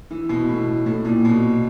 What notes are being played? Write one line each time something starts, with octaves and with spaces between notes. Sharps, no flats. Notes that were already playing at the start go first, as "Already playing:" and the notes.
E3
B2
A2
A2
A#2
B2